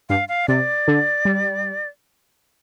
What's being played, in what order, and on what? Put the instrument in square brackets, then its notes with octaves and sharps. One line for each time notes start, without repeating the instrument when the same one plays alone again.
[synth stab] G2 [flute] F5
[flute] F5
[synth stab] C3 [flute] D5
[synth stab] D3
G3